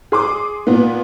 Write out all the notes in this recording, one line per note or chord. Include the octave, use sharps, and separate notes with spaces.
G#4 C6 D6
A#2 B3